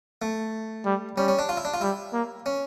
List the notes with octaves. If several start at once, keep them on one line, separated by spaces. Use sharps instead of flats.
A3
G3
G3 C#4
C#4
D4
F4
E4
D4
F4
G3 E4
A#3
C#4